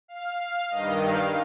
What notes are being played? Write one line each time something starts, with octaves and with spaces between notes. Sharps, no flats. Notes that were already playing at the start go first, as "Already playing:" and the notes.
F5
F5
G2 D#3 D#5
F5